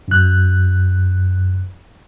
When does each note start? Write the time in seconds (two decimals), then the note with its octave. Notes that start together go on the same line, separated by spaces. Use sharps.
0.08 F#2 F#6